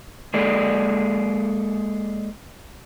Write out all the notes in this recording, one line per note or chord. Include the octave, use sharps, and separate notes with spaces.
G#3 A#3 G#4 A4 D5